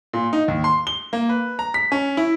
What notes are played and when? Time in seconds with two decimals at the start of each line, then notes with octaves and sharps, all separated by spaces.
0.13 A#2
0.33 D#4
0.48 D#2
0.64 C6
0.87 G7
1.13 A#3
1.29 B4
1.59 A#5
1.74 B6
1.92 C#4
2.17 E4